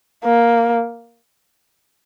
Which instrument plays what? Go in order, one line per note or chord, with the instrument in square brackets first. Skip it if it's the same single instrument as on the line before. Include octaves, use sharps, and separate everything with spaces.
[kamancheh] A#3